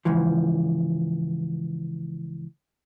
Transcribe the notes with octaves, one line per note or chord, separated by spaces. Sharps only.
C#2 G#2 E3 F3